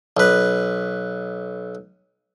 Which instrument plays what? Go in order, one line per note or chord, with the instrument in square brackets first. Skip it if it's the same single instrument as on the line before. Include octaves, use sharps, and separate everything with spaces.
[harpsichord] B1 B4